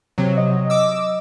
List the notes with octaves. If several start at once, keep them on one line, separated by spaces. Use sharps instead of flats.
C3 F#3
D#5
D6 E6